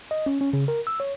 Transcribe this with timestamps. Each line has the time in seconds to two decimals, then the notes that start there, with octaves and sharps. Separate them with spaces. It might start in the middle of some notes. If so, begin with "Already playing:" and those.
0.11 D#5
0.26 C#4
0.41 C#4
0.53 C#3
0.68 A#4
0.87 E6
1.00 C#5